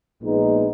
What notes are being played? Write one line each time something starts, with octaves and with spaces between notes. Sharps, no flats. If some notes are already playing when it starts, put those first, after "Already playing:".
A#1 A#2 G#3 B3 D#4